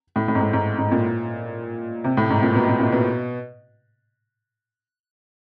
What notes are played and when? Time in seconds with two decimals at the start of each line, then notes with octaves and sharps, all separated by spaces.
0.16 A2
0.28 A2
0.35 G#2
0.41 A2
0.53 G#2
0.79 G#2
0.91 A#2
2.04 C3
2.17 A2
2.30 G#2
2.43 A#2
2.55 B2
2.67 B2
2.80 A#2
2.92 B2